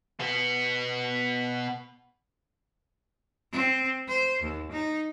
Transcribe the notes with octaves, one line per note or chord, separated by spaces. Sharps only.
B2 B3
C4
C5
D#2
D#4